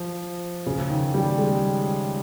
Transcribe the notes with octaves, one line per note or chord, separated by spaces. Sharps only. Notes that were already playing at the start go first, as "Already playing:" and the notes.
Already playing: F3
C#3
D#3
G3
G#3